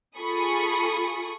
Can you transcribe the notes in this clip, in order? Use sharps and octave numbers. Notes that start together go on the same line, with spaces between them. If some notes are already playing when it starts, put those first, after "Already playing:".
F4 G#4 A4 B5 C#6 D#6